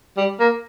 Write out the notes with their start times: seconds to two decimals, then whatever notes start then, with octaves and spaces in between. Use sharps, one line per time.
0.17 G3
0.40 A#3